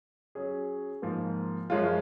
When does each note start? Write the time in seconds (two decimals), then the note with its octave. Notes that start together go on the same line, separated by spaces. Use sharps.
0.35 F#3 C#4 G#4
1.02 G#2 F3 A#3
1.70 F#2 F3 G#3 C#4 F4